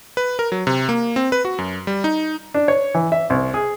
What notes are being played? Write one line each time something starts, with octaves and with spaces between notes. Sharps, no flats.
B4
A#4
F#3
C3
A#3
C4
B4
F#4
F#2
G3
D#4
D4
C#5
E3
E5
C2
G#4